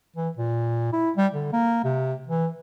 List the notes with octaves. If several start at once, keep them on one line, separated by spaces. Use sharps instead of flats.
E3
A#2
E4
G3
D3
A#3
C3
E3